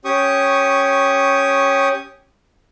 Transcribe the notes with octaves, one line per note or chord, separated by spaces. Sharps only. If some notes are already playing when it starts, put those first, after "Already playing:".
C#4 G4 C#6 D#6